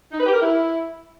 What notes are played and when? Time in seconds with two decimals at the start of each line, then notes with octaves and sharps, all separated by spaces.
0.12 D#4
0.19 B4
0.26 G4
0.34 A#4
0.41 E4